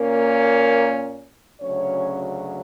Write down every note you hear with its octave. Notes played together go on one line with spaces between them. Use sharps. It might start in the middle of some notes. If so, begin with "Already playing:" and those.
Already playing: A#2 A#3 C#4 A#4
D2 C#3 F#3 C#4 C#5